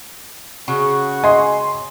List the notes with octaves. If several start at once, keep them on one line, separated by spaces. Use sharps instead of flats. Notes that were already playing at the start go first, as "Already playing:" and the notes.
C#3 F#4 F#5 C#6
D#5 G#5 C6